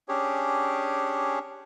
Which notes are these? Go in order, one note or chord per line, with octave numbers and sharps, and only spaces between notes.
C#4 D4 G4 G#4 C#5